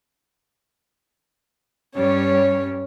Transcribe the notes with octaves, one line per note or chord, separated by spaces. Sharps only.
G2 G3 C#4 C#5